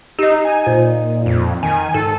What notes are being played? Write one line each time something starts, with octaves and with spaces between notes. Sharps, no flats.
D#4 G4 D#5
G#5
A#2 C5
F2
D#3 G#5
G#2 A4